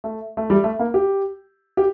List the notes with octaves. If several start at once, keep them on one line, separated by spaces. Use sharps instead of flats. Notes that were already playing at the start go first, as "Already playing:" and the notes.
A3
A3
G3
A3
A#3
G4
G4